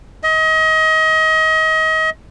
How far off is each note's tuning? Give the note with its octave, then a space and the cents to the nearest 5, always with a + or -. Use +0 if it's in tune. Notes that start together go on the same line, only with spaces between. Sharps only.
D#5 +30